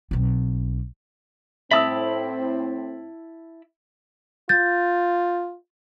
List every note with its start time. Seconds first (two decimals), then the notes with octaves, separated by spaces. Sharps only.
0.11 B1 C4
1.71 A2 C4 E4 E5 A5 B5 D#6 E6
4.49 F4 G6 A6